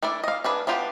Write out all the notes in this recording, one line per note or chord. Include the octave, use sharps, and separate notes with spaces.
A3 D4 E4 D5
D#5 F5
D4 G#4 B4
B3 D4 F4 G4